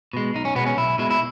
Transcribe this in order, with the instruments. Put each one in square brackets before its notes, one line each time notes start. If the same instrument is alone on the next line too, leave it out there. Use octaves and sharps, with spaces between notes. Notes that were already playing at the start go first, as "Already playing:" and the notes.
[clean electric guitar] B2 G#3
B1 D#4
C#4
B2 G#3 B3
C#4
B1 E4
B2 G#3 E4
E4